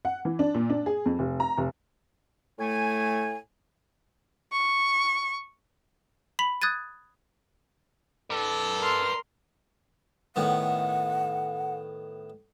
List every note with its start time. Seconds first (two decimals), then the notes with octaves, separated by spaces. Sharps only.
0.05 F#5
0.25 E3
0.39 D4
0.55 A#2
0.70 D4
0.86 G#4
1.06 F2
1.19 F1
1.40 A#5
1.58 F1
2.59 A2 A3 G#5
4.52 C#6
6.39 B5 B6 F7 F#7
6.62 D#6 F#6 G#6 A6 D#7
8.30 A4 B4 D5
8.79 A#4 C6 F6
10.36 A2 D#3 B3 F#5